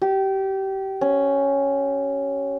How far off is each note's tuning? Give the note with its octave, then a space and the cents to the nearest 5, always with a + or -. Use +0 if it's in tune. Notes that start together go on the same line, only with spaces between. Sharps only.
G4 -25
C#4 +0